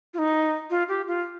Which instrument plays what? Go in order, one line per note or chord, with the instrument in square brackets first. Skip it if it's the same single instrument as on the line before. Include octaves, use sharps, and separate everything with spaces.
[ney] F4
D#4
F4
G4
F4